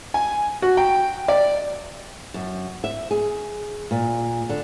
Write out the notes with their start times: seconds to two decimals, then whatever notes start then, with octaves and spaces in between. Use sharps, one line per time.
0.14 G#5
0.62 F#4
0.77 G5
1.28 D5
2.34 F#2
2.84 E5
3.11 G#4
3.91 A#2
4.49 D3